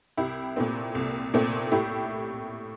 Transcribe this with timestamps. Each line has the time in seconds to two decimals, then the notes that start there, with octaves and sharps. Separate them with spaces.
0.17 C2 E4 G4
0.56 A#2 A3 C4
0.95 C2
1.34 A#2 A3 C4
1.72 A2 E4 G4